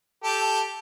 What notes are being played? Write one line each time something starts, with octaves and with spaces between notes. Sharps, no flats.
G4 A4